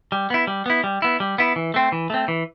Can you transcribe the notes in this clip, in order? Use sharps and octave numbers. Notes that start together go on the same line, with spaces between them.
G3
B3 E4
G3
B3 E4
G3
B3 E4
G3
B3 E4
E3
A3 C4
E3
A3 C4
E3